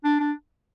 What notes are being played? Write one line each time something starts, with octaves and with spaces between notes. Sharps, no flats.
D4
D4